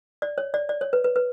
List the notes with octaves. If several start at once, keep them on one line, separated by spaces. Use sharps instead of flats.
D5
C#5
D5
D5
C#5
B4
B4
B4